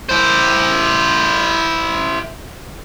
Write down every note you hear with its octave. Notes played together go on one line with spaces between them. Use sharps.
E4 C5